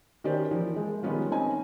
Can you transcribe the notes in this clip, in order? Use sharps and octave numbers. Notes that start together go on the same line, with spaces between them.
D#3 C#4 G4 C5 D5
E3 F3 A#3
G#3
D#3 G3 B3 C#4 F4
C4 C#4 D#4 G#5